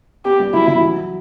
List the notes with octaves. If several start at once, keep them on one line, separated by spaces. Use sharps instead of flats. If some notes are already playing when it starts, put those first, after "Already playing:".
B3 G4
G3
F#3 E4
E3
F#3